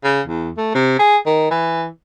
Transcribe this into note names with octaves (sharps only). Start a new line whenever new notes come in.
C#3
E2
A3
C3
G#4
D#3
E3